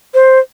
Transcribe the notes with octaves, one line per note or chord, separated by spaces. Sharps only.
C5